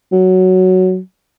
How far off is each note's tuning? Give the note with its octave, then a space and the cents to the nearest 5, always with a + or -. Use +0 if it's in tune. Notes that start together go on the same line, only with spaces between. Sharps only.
F#3 +5